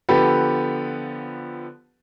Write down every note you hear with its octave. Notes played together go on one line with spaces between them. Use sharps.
D3 F3 B3 G4 A4 B4